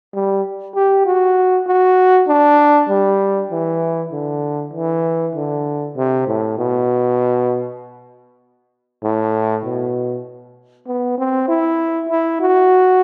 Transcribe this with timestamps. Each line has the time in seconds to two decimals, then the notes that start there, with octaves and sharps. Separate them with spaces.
0.14 G3
0.75 G4
1.06 F#4
1.67 F#4
2.28 D4
2.89 G3
3.51 E3
4.12 D3
4.73 E3
5.35 D3
5.96 C3
6.27 A2
6.58 B2
9.03 A2
9.65 B2
10.87 B3
11.18 C4
11.48 E4
12.09 E4
12.41 F#4